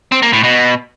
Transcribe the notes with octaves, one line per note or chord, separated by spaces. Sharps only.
C4
A#3
A2
B2